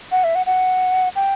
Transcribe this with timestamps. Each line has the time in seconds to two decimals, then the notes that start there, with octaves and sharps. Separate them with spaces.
0.12 F#5
0.24 E5
0.35 F#5
0.46 F#5
1.16 G5